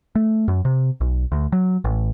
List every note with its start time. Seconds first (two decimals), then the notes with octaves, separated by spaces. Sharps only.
0.15 A3
0.48 F#2
0.65 C3
1.01 B1
1.32 D2
1.52 F#3
1.84 A1